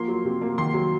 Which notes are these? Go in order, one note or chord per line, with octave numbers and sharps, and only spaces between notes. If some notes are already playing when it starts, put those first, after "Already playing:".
Already playing: F3 A#3 C6
F#3
C3
A#3
D#3 C6
F#3